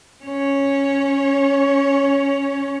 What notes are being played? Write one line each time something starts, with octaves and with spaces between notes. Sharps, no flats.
C#4 C#5